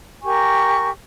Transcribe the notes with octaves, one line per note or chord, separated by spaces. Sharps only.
G4 A#4 G#5 C#6